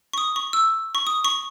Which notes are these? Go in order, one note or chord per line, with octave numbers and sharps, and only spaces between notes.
C#6
D#6
C#6
E6
C#6
D#6
C#6